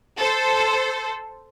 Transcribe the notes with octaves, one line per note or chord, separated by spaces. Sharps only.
A4 C5